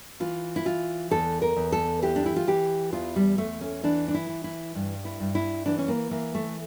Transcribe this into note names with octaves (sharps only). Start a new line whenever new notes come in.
E3 F4
E4
E3 F4
E2 A4
A#4
E2
A4
E3 G4
D4
E4
F4
E3 G4
E2 F4
G3
E2 A3
C#4
E3 D4
D4
E4
E3
E4
G2
E4
G2
E4
E3 D4
C#4
A#3
E3 A#3
A3